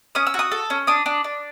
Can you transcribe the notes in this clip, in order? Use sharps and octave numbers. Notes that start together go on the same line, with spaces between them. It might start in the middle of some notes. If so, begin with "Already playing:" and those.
C#4 D#6
E6
F#4
D#6
A4
C#4
D4 D#6
D4
D4